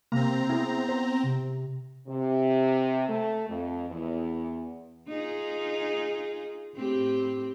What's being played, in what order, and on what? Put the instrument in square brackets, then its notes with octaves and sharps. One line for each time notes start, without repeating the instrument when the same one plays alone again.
[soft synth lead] C3 [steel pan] A#3 [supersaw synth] C4 A#5
[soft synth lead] B3 [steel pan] E4 G#4
[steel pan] C5
[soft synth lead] C3
[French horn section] C3
A3
F2
E2
[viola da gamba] D#4 F4 G#4
A2 C4 G4